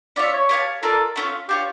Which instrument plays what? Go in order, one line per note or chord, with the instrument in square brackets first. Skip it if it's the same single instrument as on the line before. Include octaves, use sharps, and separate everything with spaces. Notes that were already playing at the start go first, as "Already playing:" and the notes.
[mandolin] C#4 F4 C#5 E5 [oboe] D5
[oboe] C#5
[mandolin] G4 C#5 F5 A5
[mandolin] F4 A#4 D5 [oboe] A4
[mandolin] A3 C#4 F4
[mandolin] D4 F4 C#5 [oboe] G4